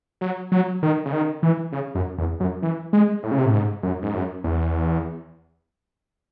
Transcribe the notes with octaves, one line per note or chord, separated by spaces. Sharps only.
F#3
F#3
D#3
C#3
D#3
E3
C#3
F#2
E2
F#2
E3
G#3
A2
C#3
C3
A2
G#2
F#2
G#2
F#2
E2